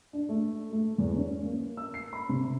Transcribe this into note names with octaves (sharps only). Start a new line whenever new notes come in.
D4
A3
A3
E2
C#4
A#3
E6
C7
B5
C3